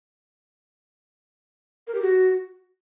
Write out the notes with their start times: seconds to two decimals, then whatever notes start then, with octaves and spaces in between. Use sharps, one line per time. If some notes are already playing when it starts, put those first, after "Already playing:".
1.88 A#4
1.95 G4
2.02 F#4